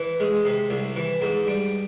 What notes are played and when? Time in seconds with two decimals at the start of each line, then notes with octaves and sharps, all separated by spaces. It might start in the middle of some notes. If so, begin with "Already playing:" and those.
Already playing: E3
0.20 G#3
0.45 C3
0.70 C2
0.96 E3
1.21 G#2
1.47 G3